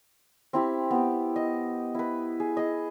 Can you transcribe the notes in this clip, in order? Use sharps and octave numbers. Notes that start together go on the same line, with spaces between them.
C4 E4 G4
B3 G4
D#5
E4 B4
G#4
G#4 D#5